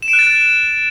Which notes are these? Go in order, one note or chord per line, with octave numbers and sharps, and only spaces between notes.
E7
D7
F#6
A6